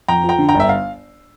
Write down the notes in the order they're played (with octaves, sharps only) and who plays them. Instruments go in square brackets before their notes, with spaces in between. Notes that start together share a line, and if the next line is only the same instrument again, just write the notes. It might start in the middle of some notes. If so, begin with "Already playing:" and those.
[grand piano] F2 [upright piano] G5 A#5
[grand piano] F3
[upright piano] G5 A#5
[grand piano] D3
[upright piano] G5 A#5
[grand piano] G1
[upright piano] E5
F5